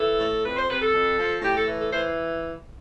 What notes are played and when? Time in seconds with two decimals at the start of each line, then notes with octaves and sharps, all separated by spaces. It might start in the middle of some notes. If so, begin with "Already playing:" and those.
Already playing: E3 A4
0.19 A2
0.43 F2 B4
0.56 C5
0.69 C3 B4
0.81 A4
0.92 F2
1.18 F3
1.42 A2 G4
1.55 A4
1.67 E3
1.80 A4
1.91 E3 C5